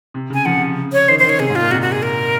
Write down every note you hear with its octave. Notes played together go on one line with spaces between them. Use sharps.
C3
C#3 G#5
F3 F#5
C3
C#3
C#5
D#3 C5
C5
D#3
C#5
C3 G#4
G#2
A#2 F4
C3 F#4
F#4
G#4
A#4